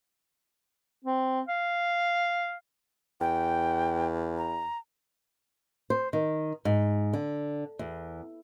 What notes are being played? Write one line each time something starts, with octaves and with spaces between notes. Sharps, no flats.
C4
F5
E2 G5
A#5
C5
D#3
G#2
D3
E2